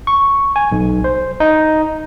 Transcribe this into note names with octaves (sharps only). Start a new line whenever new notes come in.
C#6
G#5
B1
C5
D#4